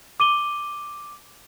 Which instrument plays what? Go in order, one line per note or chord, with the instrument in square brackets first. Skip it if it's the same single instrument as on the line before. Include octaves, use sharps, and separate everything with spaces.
[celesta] D6 D#7 G7